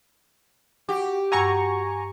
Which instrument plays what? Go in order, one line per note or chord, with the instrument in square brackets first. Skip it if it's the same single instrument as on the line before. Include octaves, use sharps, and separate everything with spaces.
[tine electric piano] F#4 [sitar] G4
[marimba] G2 E6 [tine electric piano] F#4 [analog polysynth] G#5 A#5 C#6